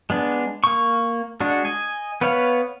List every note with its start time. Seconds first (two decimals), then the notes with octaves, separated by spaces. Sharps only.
0.10 G#3 B3 D4
0.64 A#3 C#6
1.40 G#3 D4 F#4
1.65 D#5 G#5
2.21 B3 B4 C#5 F5